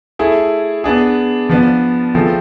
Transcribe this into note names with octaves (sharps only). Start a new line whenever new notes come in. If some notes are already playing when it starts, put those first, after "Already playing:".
A3 E4 G#4
B3 D4 G#4
F3 B3 D4
F3 A3 C4 F4 G#4